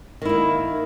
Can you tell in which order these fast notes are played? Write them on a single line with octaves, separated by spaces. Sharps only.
D#3 E4 A#3